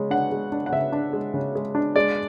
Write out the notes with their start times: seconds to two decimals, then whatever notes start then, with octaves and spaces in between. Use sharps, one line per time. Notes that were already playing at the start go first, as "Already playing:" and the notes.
Already playing: C#3 G#3
0.10 D4 F#5
0.32 G#3
0.52 D4
0.66 F#5
0.72 C#3 E5
0.92 D4
1.13 G#3
1.34 C#3
1.55 G#3
1.75 D4
1.96 G#3 D5